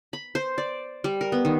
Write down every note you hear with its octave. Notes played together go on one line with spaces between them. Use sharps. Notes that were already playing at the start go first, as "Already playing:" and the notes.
B5
C5
D5
G3
A#4
B3
D#3